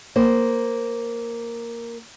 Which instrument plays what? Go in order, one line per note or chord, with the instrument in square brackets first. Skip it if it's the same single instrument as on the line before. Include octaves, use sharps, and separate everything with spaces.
[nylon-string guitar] A#3 C5